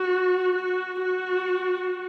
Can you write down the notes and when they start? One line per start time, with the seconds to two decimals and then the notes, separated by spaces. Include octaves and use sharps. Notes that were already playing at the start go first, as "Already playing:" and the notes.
Already playing: F#4
0.56 F#4
1.03 F#4